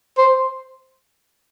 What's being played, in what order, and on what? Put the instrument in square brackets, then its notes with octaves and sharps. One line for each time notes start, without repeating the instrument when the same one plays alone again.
[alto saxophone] C5